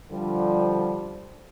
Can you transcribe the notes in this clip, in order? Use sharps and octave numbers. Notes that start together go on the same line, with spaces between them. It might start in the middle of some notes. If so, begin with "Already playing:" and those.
D3 F3 G3